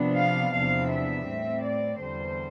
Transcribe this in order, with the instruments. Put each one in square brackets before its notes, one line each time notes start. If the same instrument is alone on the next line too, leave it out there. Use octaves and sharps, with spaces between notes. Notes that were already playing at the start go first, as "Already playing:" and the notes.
Already playing: [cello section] C3 F3 B3 D4
F5
E2 C3 F3 B3 D4 F5
E5
A2 G3 C4
D5
E2 D3 G3 C5